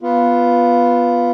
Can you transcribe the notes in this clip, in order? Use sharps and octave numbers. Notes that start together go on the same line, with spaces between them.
B3 F4